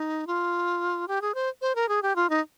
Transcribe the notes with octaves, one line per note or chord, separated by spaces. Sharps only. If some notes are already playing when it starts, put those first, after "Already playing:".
Already playing: D#4
F4
G4
G#4
C5
C5
A#4
G#4
G4
F4
D#4